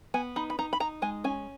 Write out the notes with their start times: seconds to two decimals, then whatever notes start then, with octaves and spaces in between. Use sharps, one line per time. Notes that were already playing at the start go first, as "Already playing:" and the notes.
0.14 B3 G#5
0.36 D#4 B5
0.50 B5
0.59 D#4 A#5
0.73 B5
0.80 D#4 A#5
1.02 G#3 G#5
1.24 C#4 G#5